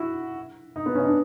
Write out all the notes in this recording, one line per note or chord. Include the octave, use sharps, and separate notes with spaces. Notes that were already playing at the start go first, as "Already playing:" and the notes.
Already playing: E4 F#4
D#4
B3
C#4
D#4
D4